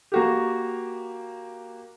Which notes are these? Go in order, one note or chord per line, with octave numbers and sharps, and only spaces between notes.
A#3 F#4 G4